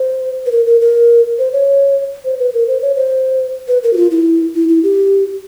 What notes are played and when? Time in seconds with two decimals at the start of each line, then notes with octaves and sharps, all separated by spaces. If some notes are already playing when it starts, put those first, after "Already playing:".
Already playing: C5
0.46 B4
0.52 A#4
0.67 A#4
0.81 A#4
1.39 C5
1.53 C#5
2.25 C5
2.39 B4
2.54 A#4
2.68 C5
2.82 C#5
2.96 C5
3.68 B4
3.83 A#4
3.93 F#4
3.97 F4
4.11 E4
4.55 E4
4.69 E4
4.83 G4